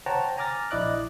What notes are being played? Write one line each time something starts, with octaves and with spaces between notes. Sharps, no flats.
C5 C#5 F#5 G5 A5 A#5
G#5 A#5 D6 F6 A6 A#6
A#1 E4 D5 D#5 D6 F#6